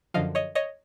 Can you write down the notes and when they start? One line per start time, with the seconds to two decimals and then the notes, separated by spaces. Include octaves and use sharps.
0.14 F#2 D3 F3 D#5 F5
0.35 C#5 D#5
0.55 C#5 D#5